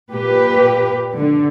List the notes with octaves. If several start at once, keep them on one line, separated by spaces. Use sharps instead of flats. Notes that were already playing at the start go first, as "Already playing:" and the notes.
A#2 G4 B4
D3